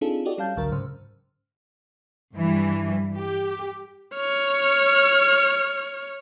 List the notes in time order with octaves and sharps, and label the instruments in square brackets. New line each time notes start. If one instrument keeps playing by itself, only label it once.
[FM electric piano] C4 D4 D#4 F4 G#4 A4
E4 F#4 G4 A4 D5 D#5
G3 C#4 A4 F5 A5 G6
G#1 C#2 D3 F#3 A#4
G#2 C#3 C5 F6
[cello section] G2 E3 G3
G4
[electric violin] C#5 F6